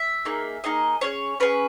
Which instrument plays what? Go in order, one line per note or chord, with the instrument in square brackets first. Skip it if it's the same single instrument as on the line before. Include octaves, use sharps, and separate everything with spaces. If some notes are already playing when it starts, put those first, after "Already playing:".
Already playing: [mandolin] E5
A#3 D#4 G#4
A#3 D#4 G#4 D#5
C#4 G#4 C#5
C#4 G#4 B4